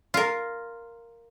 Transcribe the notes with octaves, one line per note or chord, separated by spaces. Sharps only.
F4 A#4